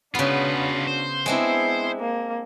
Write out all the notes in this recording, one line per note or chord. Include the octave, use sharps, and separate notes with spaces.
C#3 B3 D4 F4 F#4 B4
C5
G#3 B3 C4 D4 E4
A#3